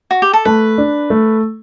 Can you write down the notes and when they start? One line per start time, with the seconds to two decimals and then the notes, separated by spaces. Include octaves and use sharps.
0.11 F#4
0.22 G4
0.33 A4
0.45 A3 B4
0.78 D4
1.10 A3